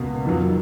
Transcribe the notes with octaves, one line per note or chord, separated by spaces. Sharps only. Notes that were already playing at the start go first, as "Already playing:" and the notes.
Already playing: C#2 B2 A#3
F2 D#3 F#3